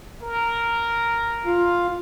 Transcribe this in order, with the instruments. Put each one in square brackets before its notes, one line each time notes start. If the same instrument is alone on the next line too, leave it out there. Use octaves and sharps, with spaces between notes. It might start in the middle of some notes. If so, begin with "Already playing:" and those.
[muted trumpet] A#4
[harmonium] F4 F5